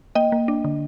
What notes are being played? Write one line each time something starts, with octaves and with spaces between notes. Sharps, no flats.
A#3 D#5 G5
A#3
D4
D3